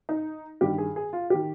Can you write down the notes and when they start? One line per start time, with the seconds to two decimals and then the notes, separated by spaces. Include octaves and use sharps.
0.09 D#4
0.61 G2 D#3 G4
0.78 G#4
0.96 G#4
1.13 F4
1.30 D#3 G4